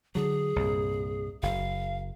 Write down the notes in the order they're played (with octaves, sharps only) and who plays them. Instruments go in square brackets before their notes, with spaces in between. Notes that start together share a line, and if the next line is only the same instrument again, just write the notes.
[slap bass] D3 F#3 [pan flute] G#4
[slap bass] C2 G2 A#2
[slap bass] F#1 [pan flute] F5